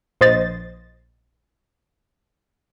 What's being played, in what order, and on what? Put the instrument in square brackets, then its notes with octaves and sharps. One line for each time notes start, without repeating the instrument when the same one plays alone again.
[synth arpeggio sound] A#1 C5 D#5 A6